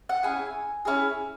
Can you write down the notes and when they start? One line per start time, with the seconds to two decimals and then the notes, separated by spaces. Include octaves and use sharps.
0.09 F#5
0.23 C#4 E4 G#4 G#5
0.85 C#4 E4 G#4